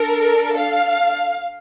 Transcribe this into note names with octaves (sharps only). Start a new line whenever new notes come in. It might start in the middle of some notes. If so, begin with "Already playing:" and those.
Already playing: D4 A4 A#4
F5